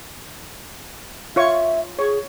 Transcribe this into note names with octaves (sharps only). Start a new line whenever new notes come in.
F4 C#5 E5 C#6
G#4 C#5